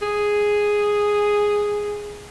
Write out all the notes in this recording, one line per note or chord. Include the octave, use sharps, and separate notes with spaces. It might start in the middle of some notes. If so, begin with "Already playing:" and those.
G#4